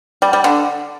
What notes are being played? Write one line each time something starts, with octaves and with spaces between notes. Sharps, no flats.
G3
G3
D3